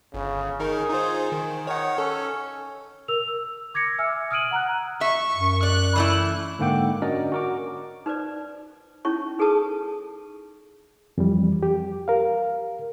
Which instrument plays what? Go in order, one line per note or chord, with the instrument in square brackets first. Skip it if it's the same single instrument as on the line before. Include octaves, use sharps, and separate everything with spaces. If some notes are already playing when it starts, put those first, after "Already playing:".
[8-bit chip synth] G1 [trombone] C#3
[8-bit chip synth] D#3 D#4 A#4 [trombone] G#4
[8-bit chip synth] D#4 F4 C5
D#3
[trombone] D#3 [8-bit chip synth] C#5 F#5
[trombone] C#4 [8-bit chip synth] A4
[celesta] A#4 E6 F7
E6
D6 G#6 A#6 C#7
E5 G#5 E6 F6
D#6 F6 G#6 D7 D#7 F#7
F#5 A#5 F6 F#6
[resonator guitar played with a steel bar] E5 [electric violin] C#6
[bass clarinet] F#2
[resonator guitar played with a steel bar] D5 [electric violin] F#6
[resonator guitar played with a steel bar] E3 A3 E4
[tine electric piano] G#2 D3 A#3 F#5 G5 D6
C#4 D4 F#4 A#4 D5 D#5
F#4 A#4 D6
[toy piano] D#4 B4 C5 D5
C#4 D#4 E4 C#5 C#6
D#4 G#4 A4 B4 A5 D#6
[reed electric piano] F2 E3 F3 G3
G4
A#4 F5